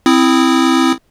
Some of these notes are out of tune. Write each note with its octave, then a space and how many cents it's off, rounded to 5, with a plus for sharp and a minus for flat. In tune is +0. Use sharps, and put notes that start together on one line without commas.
C4 +0 E4 +0 D#6 +0